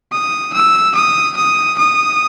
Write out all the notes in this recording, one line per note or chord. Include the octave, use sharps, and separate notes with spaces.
D#6
E6
D#6
D#6
D#6